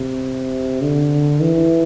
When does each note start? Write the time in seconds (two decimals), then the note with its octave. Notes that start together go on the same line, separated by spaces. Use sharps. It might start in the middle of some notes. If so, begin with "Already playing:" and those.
Already playing: C3
0.82 D3
1.42 E3